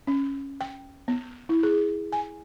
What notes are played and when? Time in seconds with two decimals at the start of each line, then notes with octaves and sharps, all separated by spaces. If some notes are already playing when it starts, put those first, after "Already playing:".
0.07 C#4
0.61 G5
1.08 B3
1.49 E4
1.63 G#4
2.12 G#5